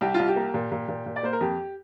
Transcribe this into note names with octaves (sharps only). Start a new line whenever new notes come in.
C2 G4
C2 F4
G4
A#3
A#2
A#2
A#2
A#2
D5
A#3 C5
A#4
F2 G4